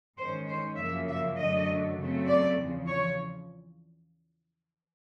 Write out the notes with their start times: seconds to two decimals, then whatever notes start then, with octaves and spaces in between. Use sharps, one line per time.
0.17 G#2 D#3 G#3 C#4 C5
0.47 C5
0.77 F#2 C#3 F3 A#3 E5
1.07 E5
1.37 F#2 D3 F#3 A3 D#5
1.97 C#3 F#3 A3 C4
2.26 D5
2.57 E2 C#3 F3
2.87 C#5